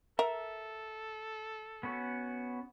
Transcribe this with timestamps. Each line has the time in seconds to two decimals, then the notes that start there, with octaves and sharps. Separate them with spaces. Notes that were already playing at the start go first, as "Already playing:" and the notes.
0.19 A4 A#4 E5
1.83 B3 C#4 F#4